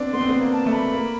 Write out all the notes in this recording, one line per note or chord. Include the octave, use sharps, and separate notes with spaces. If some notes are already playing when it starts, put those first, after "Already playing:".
Already playing: B3 C4 D4
B3 C6
C4
B3
A#3
A5
A3
B5
A#3